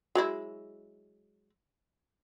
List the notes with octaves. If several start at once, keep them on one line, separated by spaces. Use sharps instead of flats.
F#3 G#3 E4